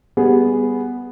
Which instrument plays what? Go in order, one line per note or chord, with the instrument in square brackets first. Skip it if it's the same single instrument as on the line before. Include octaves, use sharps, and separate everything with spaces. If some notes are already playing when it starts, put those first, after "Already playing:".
[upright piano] G3 B3 G#4